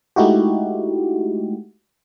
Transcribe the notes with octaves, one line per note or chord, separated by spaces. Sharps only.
G#3 A3 D#4 E4 F#4 G4